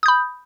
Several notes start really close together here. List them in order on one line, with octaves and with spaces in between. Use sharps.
D#6 G6 B5